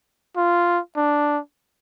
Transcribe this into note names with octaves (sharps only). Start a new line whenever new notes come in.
F4
D4